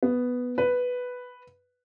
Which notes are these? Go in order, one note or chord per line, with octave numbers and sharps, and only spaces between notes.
B3
B4